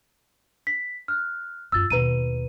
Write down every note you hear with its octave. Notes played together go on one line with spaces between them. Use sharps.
B6
F6 F#6
F#2 F4 E6 A6
D#2 B2 B4 A#5 D#7